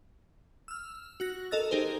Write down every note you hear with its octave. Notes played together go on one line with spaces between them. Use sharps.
E6 F6
F#4 F#6 A#6
A4 A#4 D#5 E6 A6
D#4 G4 G#4 A#4 C5